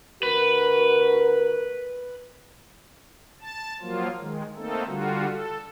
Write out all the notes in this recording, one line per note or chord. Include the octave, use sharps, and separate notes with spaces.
D2 F#4 A#4 B4
A5
F3 F#3 A#3 F4
D#3 G#3
A3 A#3 C4 D#4 A4
D3 G3 F4 F#4
A4